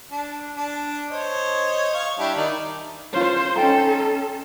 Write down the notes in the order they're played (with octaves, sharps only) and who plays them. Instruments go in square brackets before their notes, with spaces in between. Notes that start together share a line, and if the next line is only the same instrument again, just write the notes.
[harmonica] D4
D4
C5 C#5 D#5
F5 C#6
G3 D4 E4
D#3 D#4 D5
[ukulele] C#4 F4 [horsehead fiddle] C5
[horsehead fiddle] C#4 A4 [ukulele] D#4 G5 A#5